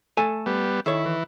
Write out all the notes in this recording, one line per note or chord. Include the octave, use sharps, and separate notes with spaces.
A3 A4 G#5
G3 B3
D#3 E4 A4 C#5
E3